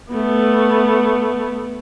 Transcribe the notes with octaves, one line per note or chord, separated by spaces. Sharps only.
A3 B3